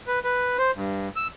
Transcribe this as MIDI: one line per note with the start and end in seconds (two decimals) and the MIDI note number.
0.07 0.19 71
0.24 0.57 71
0.58 0.71 72
0.75 1.08 43
1.16 1.28 88